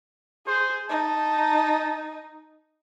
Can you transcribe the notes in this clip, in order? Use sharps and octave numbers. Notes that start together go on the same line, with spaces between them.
G#4 C5
D#4 A5